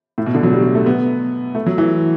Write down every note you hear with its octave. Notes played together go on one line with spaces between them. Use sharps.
A2
B2
D3
F#3
G3
G3
A3
B3
A3
F#3
E3